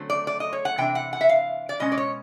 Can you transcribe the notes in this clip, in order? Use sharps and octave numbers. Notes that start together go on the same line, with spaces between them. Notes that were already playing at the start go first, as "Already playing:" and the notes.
Already playing: D3 F#3 A3 C4
D5
D5
D#5
C#5
F#5
C3 E3 D4 G5
F#5
F#5
E5
F5
D5
B2 G#3 C#4 D#5
D5
C#5